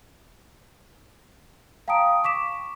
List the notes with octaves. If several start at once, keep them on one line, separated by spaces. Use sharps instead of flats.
F5 G5 A5 A#5 D#6 D7
C#6 D6 B6 E7